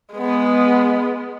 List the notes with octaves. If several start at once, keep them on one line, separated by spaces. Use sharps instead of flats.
G#3 B3